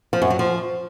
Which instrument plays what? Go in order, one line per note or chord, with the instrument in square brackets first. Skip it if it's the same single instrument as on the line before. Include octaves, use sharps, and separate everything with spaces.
[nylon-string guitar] F3
F#2
F#3
F3